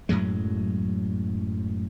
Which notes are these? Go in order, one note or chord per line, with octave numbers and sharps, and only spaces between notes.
F#2 A2 F#3 G#3